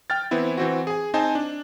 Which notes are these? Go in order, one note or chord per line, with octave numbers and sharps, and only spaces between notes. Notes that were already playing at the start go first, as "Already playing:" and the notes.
G5 F6 A6
E3 B3 C4 E4
E3 C4 F#4
G#4 G#5
C4 D#4 C5 D#5 G#5 A5
D4